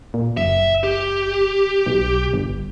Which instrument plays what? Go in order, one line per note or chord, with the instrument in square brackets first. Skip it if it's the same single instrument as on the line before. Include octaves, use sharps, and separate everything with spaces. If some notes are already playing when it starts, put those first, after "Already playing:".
[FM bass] A#2
[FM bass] F#1 [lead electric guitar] E5
[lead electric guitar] G4
[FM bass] B1
G1